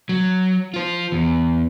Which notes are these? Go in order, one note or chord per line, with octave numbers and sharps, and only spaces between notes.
F#3
F4 C5
E2